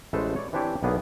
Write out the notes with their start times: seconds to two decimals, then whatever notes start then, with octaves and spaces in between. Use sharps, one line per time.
0.13 A1 G#3 A3 A4 B4 C5
0.36 C#5 D5
0.53 E3 C4 D4 E4 G4 C#5
0.83 B1 A#3 B3 D4 G#4 D5